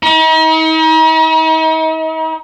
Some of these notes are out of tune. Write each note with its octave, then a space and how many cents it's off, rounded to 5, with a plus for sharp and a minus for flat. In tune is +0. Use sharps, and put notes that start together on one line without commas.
D#4 +40